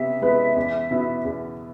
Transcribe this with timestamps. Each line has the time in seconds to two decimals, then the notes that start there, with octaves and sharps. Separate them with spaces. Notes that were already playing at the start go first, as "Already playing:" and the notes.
Already playing: C3 B3 E5
0.22 G#3 B3 E4 B4
0.56 E2
0.91 B2 B3 E4
1.25 E2